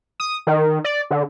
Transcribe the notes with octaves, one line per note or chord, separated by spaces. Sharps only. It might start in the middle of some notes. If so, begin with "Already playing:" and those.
D#6
D#3
D5
D3